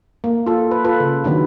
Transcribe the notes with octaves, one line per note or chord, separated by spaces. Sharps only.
A#3
F4 A4
B4
F4 A4 B4
C#3
D3 D#3 F#3 B3 B4